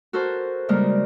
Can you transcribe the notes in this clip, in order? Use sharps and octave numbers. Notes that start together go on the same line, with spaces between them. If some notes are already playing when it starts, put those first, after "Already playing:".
F#4 A4 A#4 C5
C#3 G3 G#3 A#3 A#4